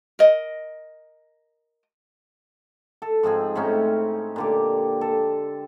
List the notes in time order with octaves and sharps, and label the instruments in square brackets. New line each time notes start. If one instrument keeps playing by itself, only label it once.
[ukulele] A#4 D#5
[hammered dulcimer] A4
G#2 F3 C4 G#4
A2 C4 C#4 D#4
A#2 D3 G4
A4